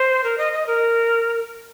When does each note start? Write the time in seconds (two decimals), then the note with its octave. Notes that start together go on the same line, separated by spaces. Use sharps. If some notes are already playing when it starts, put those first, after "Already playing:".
Already playing: C5
0.24 A#4
0.38 D#5
0.53 D#5
0.67 A#4